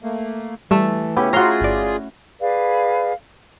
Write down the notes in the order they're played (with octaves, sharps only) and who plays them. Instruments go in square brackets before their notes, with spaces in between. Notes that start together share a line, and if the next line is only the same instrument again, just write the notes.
[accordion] A3 A#3
[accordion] E3 [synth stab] G3 [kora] A3 E5
[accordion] C#3 C#4 [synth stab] B3 [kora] E4 G4
[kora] C#4 F#4 [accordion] F4 G#4 [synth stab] A#5 C6
[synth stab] G1 D5
[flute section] G#4 B4 D5 F5